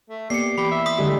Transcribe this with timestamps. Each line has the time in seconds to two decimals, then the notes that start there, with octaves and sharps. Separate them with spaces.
0.10 A3
0.30 A#3 B3 G4 D5 C7 C#7
0.58 E3 G4 B5
0.71 E5
0.86 C6 D#6 B6
0.98 D3 G#3 G4